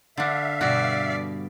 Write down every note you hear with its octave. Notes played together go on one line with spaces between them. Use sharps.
D3 D4 E5 F5
G2 B2 F#4 D5